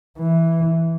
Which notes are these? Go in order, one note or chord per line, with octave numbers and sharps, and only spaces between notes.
E3